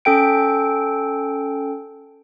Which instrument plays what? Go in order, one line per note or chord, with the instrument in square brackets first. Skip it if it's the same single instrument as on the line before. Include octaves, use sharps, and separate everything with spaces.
[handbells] C#4 A4 G5 D7